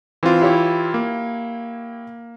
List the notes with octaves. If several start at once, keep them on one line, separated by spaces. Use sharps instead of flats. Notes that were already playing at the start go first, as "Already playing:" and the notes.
E3 C4 F4
E4 G4 C#5
A#3